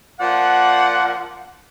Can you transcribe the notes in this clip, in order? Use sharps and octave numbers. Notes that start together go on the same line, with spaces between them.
F3 A#3 D5 F#5